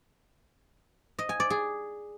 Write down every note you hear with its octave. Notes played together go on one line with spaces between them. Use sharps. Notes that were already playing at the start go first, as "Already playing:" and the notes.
D#5
G#5
D5
G#4